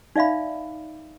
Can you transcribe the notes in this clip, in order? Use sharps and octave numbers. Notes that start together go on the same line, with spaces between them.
D#4 D5 E5 F5 B5